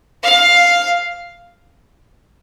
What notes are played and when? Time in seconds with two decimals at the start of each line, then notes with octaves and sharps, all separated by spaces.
0.23 F5